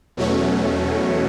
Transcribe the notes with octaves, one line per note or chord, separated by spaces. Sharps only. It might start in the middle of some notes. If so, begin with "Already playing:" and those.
E2 B2 F#3 A3 C#4